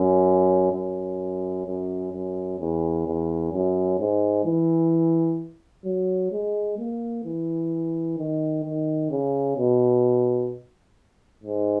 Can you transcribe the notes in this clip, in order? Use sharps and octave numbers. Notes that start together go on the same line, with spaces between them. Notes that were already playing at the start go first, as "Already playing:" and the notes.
Already playing: F#2
F#2
F#2
F#2
E2
E2
F#2
G#2
E3
F#3
G#3
A#3
E3
D#3
D#3
C#3
B2
G#2